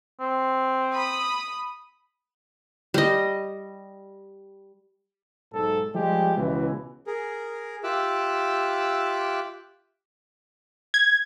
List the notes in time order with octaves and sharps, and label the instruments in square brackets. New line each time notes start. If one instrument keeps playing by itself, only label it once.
[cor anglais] C4
[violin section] B5 D#6
[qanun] G3 D#5
[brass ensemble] B1 G#2 A4
F3 G3 G#3 G4
C#2 B2 E3
[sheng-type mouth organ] G#4 A#4
F4 G4 E5 D6 E6 F#6
[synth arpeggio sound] G#6